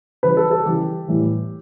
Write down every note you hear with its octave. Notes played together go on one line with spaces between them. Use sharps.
C#3 E3 G3 B4
A4
A4
C#3 E3 G3 G4
A2 E3 G3